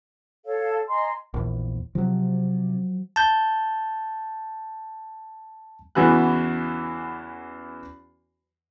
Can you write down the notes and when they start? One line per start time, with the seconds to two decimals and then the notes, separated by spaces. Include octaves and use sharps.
0.46 A4 C#5 F5
0.88 D#5 G#5 A#5 C6
1.34 A#1 E2
1.95 C3 F3 F#3
3.16 A5 G6
5.95 E2 C#3 E3 F#4 B4 F#6